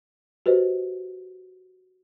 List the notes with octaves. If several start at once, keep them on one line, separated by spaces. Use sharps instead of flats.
F#4 G4 B4 C5 D#5